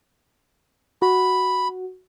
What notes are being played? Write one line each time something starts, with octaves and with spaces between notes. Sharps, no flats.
F#4 B5